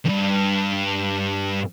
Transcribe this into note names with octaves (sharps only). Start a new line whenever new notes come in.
E2 G2